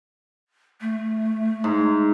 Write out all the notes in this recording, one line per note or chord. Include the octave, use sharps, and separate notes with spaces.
A3
G#2